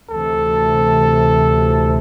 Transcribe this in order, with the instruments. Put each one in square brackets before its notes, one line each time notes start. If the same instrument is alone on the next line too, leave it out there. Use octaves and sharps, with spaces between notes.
[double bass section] D2 C3 E3 [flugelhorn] A4